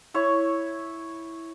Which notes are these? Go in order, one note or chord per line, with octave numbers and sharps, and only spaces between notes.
E4 C#5 C#6